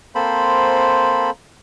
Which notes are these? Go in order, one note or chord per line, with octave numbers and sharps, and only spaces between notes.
A#3 C4 A4 C5 B5